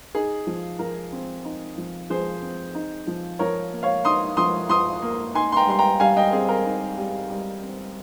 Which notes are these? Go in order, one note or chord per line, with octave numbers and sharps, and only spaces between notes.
D#4 G#4
F3
F3 A#4
C4
D#4
F3
F3 G#4 C5
C4
D#4
F3
F3 A#4 C#5
A#3
C#5 F5
D#4 C6 D#6
F3 C6 D#6
F3 C6 D#6
A#3
D#4 G#5 C6
C6
G5 A#5
G3 C6
G5 A#5
G3 F5 G#5
D#5 G5
C4 G#4
A#4
D#4
G3
G3
C4